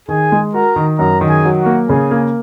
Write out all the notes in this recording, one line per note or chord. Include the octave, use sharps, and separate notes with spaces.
D#3 G#4 G#5
G#3
F#4 A#4 A#5
D#3
F#2 A#4 A#5
D#3
G#4 G#5
F#3
F#4 F#5
A#3
C#3 G#4 G#5
A#3